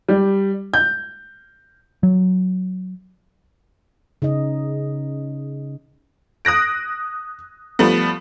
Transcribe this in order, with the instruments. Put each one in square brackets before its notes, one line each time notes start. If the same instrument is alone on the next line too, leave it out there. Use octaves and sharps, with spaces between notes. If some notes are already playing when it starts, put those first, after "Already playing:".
[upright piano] G3
G6
[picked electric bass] F#3
[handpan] C#3 D#4 D#5
[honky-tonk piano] D#6 F#6 A#6 D7
F3 G3 A3 B3